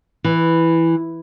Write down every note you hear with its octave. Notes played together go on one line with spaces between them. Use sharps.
E3